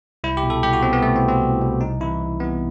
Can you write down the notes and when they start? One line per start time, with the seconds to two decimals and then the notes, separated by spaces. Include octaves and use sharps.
0.24 C2 E4
0.37 G4
0.43 B2
0.50 A4
0.63 C2 G4
0.73 F#4
0.83 B2 C4
0.93 B3
1.02 C2 A3
1.16 C4
1.22 B2
1.29 C4
1.42 C2
1.61 B2
1.81 C2 D#4
2.01 C3 E3 E4
2.21 C2
2.40 C3 E3 B3